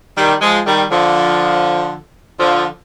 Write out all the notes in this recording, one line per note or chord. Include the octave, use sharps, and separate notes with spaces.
D#3 G3
F3 G#3
D#3 G3
D3 F3
D3 F3